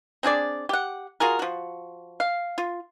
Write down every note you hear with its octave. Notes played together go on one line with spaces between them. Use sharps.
C4 D4 G#4 D5
G4 F#5
F4 F#4 G#4 A#4
F3 F#4
F5
F4